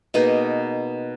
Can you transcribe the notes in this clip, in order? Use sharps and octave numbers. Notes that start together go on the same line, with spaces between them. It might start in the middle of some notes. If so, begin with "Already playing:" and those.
B2 A#3 D#4 G#4